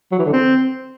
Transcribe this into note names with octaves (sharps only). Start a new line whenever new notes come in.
F#3
E3
D3
C4